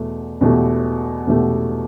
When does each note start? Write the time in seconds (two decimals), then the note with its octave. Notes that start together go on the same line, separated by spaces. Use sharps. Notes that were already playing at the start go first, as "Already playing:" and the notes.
Already playing: E2 B2 A3
0.41 E2 B2 A3 G4
1.27 E2 B2 A3 G4